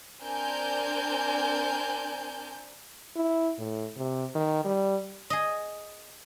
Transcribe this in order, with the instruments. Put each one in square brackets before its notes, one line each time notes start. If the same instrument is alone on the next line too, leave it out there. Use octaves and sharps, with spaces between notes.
[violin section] C4 D4 A#4 G#5 A5 G6
[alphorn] E4
A2
C3
D#3
G3
[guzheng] G#4 D#5